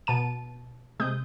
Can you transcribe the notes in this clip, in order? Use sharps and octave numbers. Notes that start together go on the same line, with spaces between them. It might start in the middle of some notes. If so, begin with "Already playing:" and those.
B2 A5 D#7
C3 G#3 D#6 G6